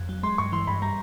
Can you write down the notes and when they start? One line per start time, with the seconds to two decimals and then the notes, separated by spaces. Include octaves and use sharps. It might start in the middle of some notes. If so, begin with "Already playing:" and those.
Already playing: F2
0.09 F#3
0.23 G#3 C6
0.38 G2 C#6
0.52 E3 C6
0.67 G2 B5
0.82 G3 A#5